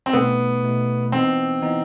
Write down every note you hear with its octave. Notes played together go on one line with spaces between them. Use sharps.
C4
B2 A3 B3 D#4
B2 A3 D#4
E3 B3 C4 D#4
E3 B3 D#4